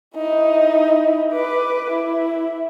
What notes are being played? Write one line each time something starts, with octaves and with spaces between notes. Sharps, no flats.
D#4 E4
B4 D6
E4